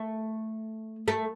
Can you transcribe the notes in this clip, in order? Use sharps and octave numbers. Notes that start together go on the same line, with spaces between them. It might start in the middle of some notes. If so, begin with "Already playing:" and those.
Already playing: A3
A3